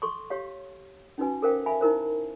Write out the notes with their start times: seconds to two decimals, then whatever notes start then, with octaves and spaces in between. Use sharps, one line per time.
0.02 A4 C6 C#6
0.30 G4 C#5 F5
1.18 C#4 D#4 F#4 B4 G#5
1.42 A4 A#4 C5 F5 G5
1.66 E5 F5 G#5 B5
1.81 D#4 E4 A#4 C5